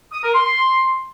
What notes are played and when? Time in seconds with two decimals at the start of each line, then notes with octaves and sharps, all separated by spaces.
0.13 D#6
0.24 A#4
0.35 C6